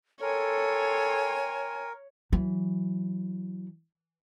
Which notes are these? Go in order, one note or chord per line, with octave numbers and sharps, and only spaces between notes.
A4 A#4 C#5 G5 G#5 C6
E3 F#3